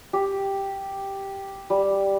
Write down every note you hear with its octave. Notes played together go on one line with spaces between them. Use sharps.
G4
G3